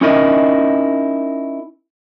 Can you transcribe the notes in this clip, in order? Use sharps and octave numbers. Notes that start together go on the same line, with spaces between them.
C#4 D#4 E4 A#4 D#5